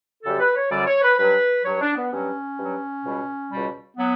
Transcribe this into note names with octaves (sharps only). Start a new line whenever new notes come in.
F#2 D3 G3 A4
B4
C#5
F#2 D3 G3 D5
C#5
B4
G2 F#3 B4
G2 F#3 C#5
D4
B3
G2 F#3 C#4
G2 F#3
C#2 B2 G3
C#2 B2 G3
F#3 B3